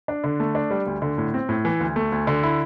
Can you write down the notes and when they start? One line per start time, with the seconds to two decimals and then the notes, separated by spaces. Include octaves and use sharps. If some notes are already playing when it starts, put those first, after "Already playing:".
0.08 D4
0.24 D3
0.40 A3
0.55 D4
0.71 G3
0.87 D2
1.02 D3
1.18 A2
1.34 C4
1.49 A2
1.65 E3
1.80 D2
1.96 A3
2.12 D2
2.27 D3
2.43 E4